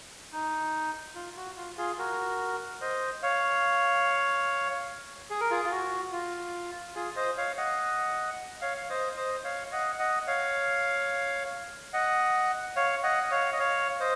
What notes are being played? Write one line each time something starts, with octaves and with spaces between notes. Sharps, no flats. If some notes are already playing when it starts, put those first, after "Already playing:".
D#4
F4
F#4
F4
F4 G#4
F#4 A#4
C5 D#5
C#5 F5
G#4
A#4
F4 G#4
F4
F#4
F4
F4 G#4
C5 D#5
C#5 F5
D#5 F#5
C#5 F5
F5
C5 D#5
C5 D#5
C#5 F5
D#5 F#5
D#5 F#5
C#5 F5
D#5 F#5
C#5 F5
D#5 F#5
D#5
C#5 F5
D#5
C#5 F5
C5 D#5